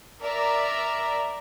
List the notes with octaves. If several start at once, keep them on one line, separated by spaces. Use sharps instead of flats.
A#4 D5 E5 A#5